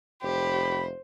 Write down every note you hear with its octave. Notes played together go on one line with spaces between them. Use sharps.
F1 G4 C5 B5